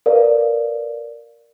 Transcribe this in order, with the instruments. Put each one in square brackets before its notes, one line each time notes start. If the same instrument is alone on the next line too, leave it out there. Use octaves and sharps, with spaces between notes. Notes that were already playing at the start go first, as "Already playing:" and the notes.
[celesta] A#4 B4 D5 F5